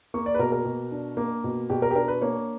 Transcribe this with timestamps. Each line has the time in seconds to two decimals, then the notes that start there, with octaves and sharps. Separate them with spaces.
0.14 A#3 C#6
0.26 D5
0.35 B4
0.39 B2 A#4
0.52 A#4
0.65 B2
0.91 D4
1.17 A#3
1.44 B2
1.70 B2 G4
1.82 A#4
1.91 G4
1.95 D4 A#4
2.08 B4
2.21 A#3 C#5